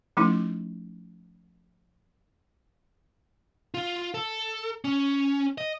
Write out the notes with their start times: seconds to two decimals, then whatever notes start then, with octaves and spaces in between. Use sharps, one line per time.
0.17 F3 A3 C#4 D#4 E4
3.74 F4
4.14 A4
4.85 C#4
5.58 D#5